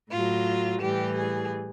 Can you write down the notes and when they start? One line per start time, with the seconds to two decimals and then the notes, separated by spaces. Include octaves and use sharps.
0.11 A2 F#3 F4
0.81 A2 E3 G3 G4
1.16 G#4